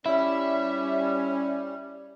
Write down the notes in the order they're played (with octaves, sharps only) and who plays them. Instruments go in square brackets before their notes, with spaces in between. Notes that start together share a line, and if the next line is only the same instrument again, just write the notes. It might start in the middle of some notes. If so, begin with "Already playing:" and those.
[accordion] G3 [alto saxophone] C#4 [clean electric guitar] E4 [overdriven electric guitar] E5